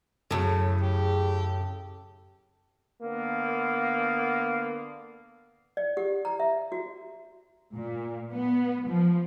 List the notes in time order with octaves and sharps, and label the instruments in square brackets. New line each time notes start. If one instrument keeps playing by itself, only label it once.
[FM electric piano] F#2 F#3 [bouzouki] A2 C#3 [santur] A4
[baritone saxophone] G4
[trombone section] D3 A#3 B3
[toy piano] D5
G4
A#5
E5
F#4
[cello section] A#2
B3
F3